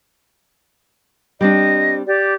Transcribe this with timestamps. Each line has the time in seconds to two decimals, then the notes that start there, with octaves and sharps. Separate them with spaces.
1.41 G3 C4 D4 D#5
2.06 G4 D5